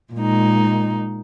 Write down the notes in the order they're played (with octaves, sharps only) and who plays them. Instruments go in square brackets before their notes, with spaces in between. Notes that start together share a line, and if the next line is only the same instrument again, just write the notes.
[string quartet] A#2 G#3 D#4